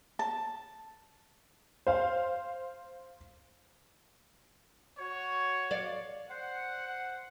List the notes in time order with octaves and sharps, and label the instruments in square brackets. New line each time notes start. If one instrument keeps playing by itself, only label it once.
[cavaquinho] A5
[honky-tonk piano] C5 F5
[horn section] F#4 C#5
[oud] D5 F5
[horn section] C5 F#5